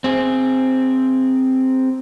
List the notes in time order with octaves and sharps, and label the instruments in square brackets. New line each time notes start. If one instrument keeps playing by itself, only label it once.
[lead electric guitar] C4 G#4